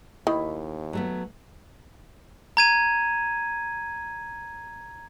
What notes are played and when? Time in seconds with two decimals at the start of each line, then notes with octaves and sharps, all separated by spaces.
0.27 D#2 D#3 E4
0.93 F#3 A3 B3
2.57 A#5 G#6 D#7